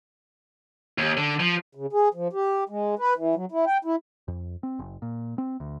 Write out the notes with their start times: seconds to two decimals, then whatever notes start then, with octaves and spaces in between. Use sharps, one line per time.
0.98 D#2
1.17 D3
1.40 F3
1.75 C#3
1.93 G#4
2.14 F3
2.33 G4
2.69 G#3
2.99 B4
3.17 E3
3.35 F#3
3.52 E4
3.66 G5
3.85 E4
4.28 F2
4.63 C4
4.79 F#1
5.02 A#2
5.38 C4
5.60 D2